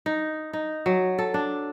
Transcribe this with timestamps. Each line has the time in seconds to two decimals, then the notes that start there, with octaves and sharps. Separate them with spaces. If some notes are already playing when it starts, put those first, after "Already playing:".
0.06 D#4
0.53 D#4
0.86 F#3
1.19 A4
1.34 D4